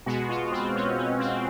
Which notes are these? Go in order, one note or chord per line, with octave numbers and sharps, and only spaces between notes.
B2 G#3 B3 F#4
F4
C4
C#4
C#4
C4